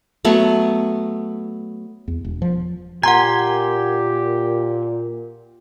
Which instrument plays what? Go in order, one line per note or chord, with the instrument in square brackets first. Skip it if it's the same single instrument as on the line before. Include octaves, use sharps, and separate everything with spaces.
[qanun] F#3 A3 B3
[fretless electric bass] E2
E1
F3
[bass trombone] A#2 [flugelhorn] G4 [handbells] F#5 A#5 [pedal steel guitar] G#5 C6